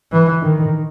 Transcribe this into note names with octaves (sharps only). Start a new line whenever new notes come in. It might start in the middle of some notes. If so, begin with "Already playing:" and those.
E3
D#3